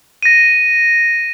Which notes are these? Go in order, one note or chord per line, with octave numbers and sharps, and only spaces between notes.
A#6 D#7